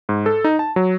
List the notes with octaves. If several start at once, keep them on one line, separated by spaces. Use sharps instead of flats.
G#2
A4
D#4
A5
F#3